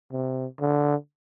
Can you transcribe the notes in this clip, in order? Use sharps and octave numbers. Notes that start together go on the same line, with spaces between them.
C3
D3